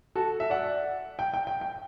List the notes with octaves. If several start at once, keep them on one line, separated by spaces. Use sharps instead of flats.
F#4 A4
E5
D5 F#5
G5
G5
G5
G5